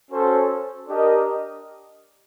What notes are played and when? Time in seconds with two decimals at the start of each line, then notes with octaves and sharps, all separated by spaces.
0.10 C#4 F#4 A4 C5
0.88 D4 G4 A#4 D#5